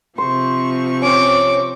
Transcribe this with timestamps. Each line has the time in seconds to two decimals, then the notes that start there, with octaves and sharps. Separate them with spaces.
0.18 C3 F3 C5 C#6
1.02 C4 C#4 D6